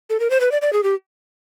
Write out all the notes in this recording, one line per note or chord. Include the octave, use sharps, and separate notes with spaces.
A4
A#4
C5
B4
D5
D5
G#4
G4